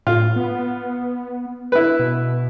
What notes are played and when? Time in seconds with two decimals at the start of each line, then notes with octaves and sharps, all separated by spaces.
0.07 A2 F4
0.36 B3
1.72 E4 B4
1.99 B2